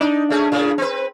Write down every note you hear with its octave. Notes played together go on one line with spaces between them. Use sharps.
D4 D#4
A3 C#4 G#4
A2 C#3
C4 B4